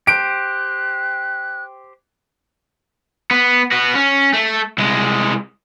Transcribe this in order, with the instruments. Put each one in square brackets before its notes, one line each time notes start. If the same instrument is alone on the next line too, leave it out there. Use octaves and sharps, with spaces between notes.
[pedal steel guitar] G4 C5 [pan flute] F#6 [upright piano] D7
[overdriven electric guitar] B3
B3 F#4
C#4
A3
C2 G#3